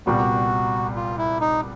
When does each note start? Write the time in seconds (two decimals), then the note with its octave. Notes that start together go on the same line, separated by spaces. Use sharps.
0.06 C2 A#2 G3 B3 F#4
0.96 F4
1.18 E4
1.41 D#4